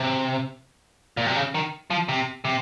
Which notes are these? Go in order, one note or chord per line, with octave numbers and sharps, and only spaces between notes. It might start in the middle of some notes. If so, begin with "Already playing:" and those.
Already playing: C3
A#2
C3
C#3
D#3
F3
C3
C3